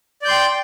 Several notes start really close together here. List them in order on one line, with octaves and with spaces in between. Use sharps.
D5 G6 C6 G5